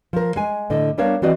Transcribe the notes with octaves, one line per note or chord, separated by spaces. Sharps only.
F3 A#4
G#3 G#5
A2 D3 D#5
G3 B3 D4 A#4 C#5 F5
E3 C4 F#4 D5 D#5